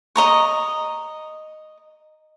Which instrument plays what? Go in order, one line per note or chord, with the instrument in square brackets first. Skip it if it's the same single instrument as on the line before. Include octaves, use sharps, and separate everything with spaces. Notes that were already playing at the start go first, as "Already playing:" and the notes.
[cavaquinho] D#5 A#5 C#6